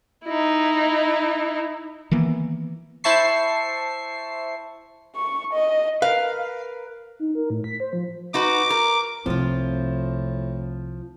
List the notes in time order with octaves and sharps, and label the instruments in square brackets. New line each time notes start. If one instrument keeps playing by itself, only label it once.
[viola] D#4 E4
[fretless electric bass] D#3 E3 A#3 B3
[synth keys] E4 C5 E5 A5 C#6 C7
[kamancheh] C#6
D#5
[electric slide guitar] A#4 B4 [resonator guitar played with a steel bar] F5
[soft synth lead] D#4
A#4
A2
B6
C5
F3
[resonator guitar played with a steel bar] D#4 F#4 B4 [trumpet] D6
[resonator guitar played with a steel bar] A#4
[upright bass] C2 C3 [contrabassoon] A2 [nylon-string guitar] F3 F4 [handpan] C4